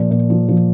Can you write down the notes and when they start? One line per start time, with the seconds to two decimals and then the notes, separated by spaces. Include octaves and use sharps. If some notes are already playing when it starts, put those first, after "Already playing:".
Already playing: A#2 F3
0.11 A#2
0.30 F3
0.49 F3